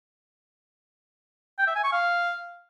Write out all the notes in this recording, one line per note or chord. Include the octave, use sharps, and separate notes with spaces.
G5
E5
G#5
C#6
F5